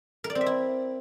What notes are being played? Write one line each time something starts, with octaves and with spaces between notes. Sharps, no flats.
A#4
D5
C4
E5
E4